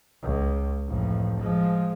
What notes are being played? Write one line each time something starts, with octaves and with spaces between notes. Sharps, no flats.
C#2
A1 F2
F3 G#3